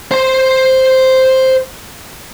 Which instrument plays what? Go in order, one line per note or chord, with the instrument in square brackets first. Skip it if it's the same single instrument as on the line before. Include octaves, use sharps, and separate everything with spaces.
[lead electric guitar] C5 C6